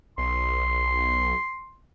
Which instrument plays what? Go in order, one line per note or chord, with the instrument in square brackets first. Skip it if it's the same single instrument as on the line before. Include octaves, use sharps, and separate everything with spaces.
[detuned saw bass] B1 [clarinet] C6